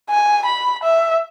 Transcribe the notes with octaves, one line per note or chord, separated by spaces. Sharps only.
G#5
B5
E5